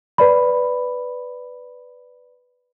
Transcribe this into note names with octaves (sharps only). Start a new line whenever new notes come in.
B4 D5 B5